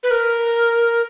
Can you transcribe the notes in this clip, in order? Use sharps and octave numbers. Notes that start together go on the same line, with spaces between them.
B4
A#4